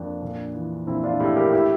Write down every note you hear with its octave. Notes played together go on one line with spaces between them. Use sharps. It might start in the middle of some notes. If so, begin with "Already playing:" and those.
Already playing: F2 A#3 D4
A#1
E3
A#1 C4 E4
D4 F4
A2 E4 G4
G4 A#4
E4 G4